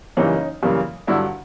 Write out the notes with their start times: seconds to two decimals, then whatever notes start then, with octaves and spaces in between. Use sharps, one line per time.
0.17 F#2 C#3 E3 G3 A#3 C#4 D#4
0.63 F#2 C#3 E3 G3 A#3
1.07 G2 D3 F#3 D4 E4